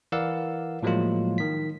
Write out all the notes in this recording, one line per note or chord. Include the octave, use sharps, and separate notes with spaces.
E3 A#4 D5 F5 F#5 E6
A2 F3 F#3 G#3 A#3 F4
D#3 B6